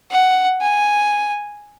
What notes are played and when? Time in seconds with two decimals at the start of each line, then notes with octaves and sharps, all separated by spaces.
0.11 F#5
0.61 G#5